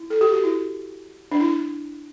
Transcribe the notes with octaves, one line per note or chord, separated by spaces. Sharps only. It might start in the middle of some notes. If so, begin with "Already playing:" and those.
Already playing: E4
A4
G4
F#4
E4
D4
E4